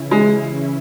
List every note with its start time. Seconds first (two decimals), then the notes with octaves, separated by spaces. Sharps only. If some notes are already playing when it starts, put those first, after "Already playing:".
Already playing: C#3 E3 C#4 E4
0.11 G#3